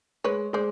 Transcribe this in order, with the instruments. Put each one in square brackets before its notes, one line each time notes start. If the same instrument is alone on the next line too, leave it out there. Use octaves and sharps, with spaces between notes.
[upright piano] G#3 [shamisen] B4 C#5
[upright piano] G#3 [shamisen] C5 D5